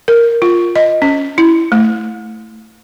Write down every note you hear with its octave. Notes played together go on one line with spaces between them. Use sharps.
A#4
F4
D#5
C#4
E4
A3